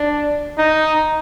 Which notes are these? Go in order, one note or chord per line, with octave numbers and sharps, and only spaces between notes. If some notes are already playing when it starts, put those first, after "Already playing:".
Already playing: D4
D#4